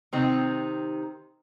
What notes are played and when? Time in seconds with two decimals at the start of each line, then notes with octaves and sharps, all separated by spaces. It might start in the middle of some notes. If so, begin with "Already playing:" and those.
0.13 C3 D#3 C4 D#4